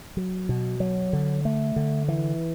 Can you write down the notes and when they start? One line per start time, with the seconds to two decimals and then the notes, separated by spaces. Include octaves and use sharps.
0.17 F#3
0.49 B2
0.80 F#3
1.13 D3
1.45 A3
1.76 D3
2.08 E3